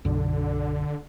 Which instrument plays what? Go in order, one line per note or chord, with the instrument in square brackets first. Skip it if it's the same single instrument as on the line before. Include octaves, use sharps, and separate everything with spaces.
[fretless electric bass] B1 F#2 [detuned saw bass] D3